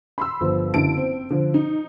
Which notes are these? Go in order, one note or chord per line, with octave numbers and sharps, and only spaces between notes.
B5 C6 E6
G1 F3
F#1 D3 E4 A5 D7
C4
D3 F3
D#4